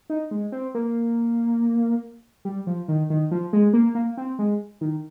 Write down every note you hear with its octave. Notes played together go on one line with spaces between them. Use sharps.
D#4
G#3
C4
A#3
G3
F3
D#3
D#3
F3
G#3
A#3
A#3
C4
G#3
D#3